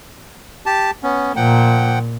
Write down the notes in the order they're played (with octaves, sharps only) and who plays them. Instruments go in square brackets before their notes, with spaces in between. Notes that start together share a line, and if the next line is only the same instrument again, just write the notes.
[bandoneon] G4 A5
B3 C#4
[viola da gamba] A#2 [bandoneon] F3 F#5 G5